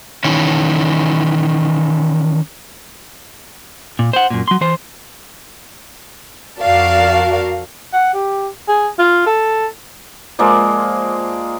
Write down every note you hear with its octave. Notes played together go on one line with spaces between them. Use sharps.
D#3 E3 C#4
A#2
C5 F#5
F#2 A#2
F#3 C6
E3 C5
F2 F#4 A#4 D5 F5 A5
F#5
G4
G#4
F4
A4
F3 G#3 A#3 D5